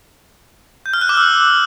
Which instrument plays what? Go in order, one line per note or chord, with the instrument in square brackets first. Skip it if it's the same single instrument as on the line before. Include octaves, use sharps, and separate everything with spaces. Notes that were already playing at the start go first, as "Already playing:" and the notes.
[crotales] G6
F6
F#6
D6
E6